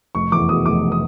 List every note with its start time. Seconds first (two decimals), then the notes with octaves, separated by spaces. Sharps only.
0.15 F1 C#6
0.32 E2 D6
0.49 B2 D#6
0.66 F1 D6
0.92 D#6